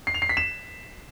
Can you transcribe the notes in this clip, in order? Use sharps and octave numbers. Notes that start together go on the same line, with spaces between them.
C7
F7
C7
B6
E7